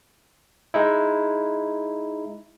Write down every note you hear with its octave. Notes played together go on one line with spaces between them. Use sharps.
G#3 D#4 E4